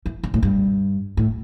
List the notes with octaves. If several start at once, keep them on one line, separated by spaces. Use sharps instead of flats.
E3
D3
A2
G2
A2